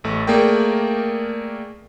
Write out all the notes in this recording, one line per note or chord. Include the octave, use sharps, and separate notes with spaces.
A1 A3
A3 A#3 G#4 A#4 D5 G5